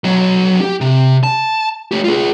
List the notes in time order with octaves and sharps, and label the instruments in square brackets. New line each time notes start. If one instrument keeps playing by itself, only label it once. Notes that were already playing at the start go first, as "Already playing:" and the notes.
[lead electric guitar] B1 F#3
G4
C3
A5
A3 G4
F4 G#4